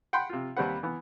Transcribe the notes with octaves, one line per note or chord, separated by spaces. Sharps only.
F#5 G5 B5 C6
C3 F4
D#2 G3 C4 B4 F#5
E3 B3